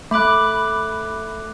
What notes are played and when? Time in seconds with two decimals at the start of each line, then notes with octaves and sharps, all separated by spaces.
0.11 A3 B5 D6 F#6